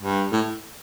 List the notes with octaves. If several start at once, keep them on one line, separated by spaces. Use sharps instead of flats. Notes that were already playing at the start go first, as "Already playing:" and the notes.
G2
A2